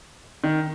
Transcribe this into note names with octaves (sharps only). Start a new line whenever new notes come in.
D#3